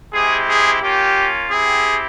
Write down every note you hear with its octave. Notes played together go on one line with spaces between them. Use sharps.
G#3 C4 E4 G4 G#4
G#4
A#3 C#4 F4 G4
C4 E4 G4 G#4